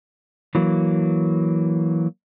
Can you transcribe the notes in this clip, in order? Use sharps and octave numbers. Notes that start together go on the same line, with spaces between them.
E3 F#3 A#3